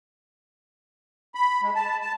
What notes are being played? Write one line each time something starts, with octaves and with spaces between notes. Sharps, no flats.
B5
G#3
A5
A5